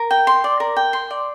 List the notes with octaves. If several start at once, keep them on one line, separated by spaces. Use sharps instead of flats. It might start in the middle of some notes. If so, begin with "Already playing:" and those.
Already playing: A#4
G5
C6
D5
A#4
G5
C6
D5